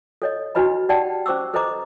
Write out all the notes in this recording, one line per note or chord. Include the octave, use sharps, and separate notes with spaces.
A4 C#5 D#5
D4 D#4 F#4 B4 D#5 B5
D#4 G4 D5 F#5 G5 A5
C#4 C5 C#6 D6 E6
A4 B4 C5 D#5 A#5 D6